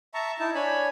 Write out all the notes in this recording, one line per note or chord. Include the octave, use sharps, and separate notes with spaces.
E5 A5 A#5 C#6
D#4 E4 A5
D4 C#5 G#5 B5